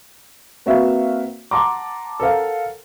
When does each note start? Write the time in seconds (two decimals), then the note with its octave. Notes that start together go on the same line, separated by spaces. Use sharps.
0.66 A#3 C4 F#4 B4 E5 F5
1.51 F#5 A5 A#5 C6 D6
2.20 A4 A#4 C5 F5 F#5